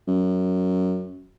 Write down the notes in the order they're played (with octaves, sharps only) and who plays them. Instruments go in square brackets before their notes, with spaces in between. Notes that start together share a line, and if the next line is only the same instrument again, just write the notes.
[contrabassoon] F#2